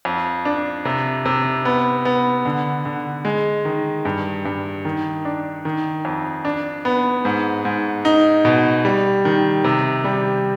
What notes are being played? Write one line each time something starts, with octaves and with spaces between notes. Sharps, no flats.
F2
D4
C3
C3
B3
B3
D3
D3
G#3
D#3
G2
G2
D#3
D4
D#3
F2
D4
B3
G#2
G#2
D#4
B2
G3
D#3
C3
G3